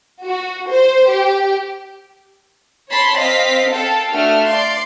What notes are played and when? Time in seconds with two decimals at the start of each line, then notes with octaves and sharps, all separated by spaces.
0.25 F#4
0.69 C5
1.09 G4
2.90 C#5 A5 B5 C6
3.18 C4 D#5 F5 B6
3.71 A4 F5 G5 A5
4.11 A3 D4 F#4 F6
4.46 D5 F5 C6